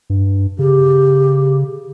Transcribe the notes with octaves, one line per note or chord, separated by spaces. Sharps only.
G2
C#3 G4